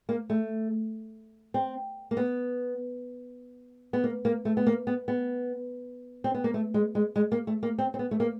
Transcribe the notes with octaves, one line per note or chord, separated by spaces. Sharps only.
A#3
A3
C4
A#3
B3
B3
A#3
A#3
A3
B3
A#3
B3
B3
C4
B3
A#3
A3
G#3
G#3
G#3
A#3
A3
A#3
C4
C4
B3
A3
A#3